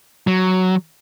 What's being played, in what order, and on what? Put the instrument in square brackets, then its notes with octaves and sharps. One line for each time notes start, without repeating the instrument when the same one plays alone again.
[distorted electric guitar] F#3